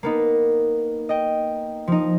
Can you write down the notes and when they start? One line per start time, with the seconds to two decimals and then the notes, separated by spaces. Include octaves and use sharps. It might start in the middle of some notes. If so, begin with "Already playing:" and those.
0.03 A#3 B3 D#4
1.09 D#5 G5
1.87 F3 D#4